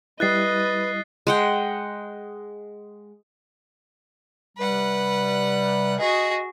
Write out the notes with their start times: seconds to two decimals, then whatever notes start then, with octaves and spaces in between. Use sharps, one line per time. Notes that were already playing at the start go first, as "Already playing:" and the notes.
0.20 G3 E4 B4 D#5 F#6 A6 C7
1.27 G#3 F#5 G5
4.57 C3 G3 B4 F#5
6.00 F#4 G#4 D#5